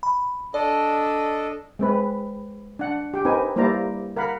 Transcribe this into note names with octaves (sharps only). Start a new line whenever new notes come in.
B5
D4 A4 D5 D#5
G#3 C4 B4
D4 F#5
G4 G5
C4 D#4 A#4 B4 G#5
G3 A#3 E4 C5 D5 A#5
A#4 F5 F#5 B5